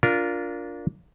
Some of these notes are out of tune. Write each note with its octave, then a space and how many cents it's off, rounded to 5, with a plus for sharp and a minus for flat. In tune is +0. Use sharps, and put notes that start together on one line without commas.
D4 -20 F4 +0 A#4 +0